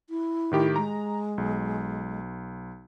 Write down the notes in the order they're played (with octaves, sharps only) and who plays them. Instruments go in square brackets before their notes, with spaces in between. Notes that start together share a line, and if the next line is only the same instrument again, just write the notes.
[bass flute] E4
[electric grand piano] A2 D#3 G4
[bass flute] G#3 [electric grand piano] A#5
[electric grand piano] B1